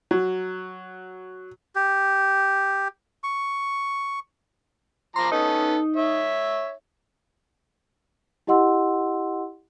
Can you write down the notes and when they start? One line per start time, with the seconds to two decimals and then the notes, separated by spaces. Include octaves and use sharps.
0.11 F#3
1.75 G4
3.24 C#6
5.16 F3 A#5 C6 D6
5.32 B3 C#4 D#4 A4
5.96 C#5 E5
8.47 E4 G4 D#5 F#5 C6 E6